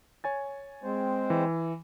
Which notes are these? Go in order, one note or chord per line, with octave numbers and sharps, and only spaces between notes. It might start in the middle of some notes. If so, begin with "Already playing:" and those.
C#5 G#5 A6
G#3 C4 C5
E3